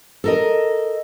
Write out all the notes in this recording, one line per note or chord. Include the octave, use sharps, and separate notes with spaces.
A4 A#4 D#5